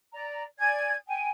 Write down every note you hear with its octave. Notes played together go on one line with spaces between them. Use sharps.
D5 A#5
D5 G#5 G#6
G5 G#5